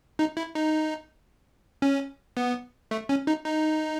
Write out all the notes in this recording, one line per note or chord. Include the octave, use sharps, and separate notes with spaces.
D#4
E4
D#4
C#4
B3
A3
C#4
D#4
D#4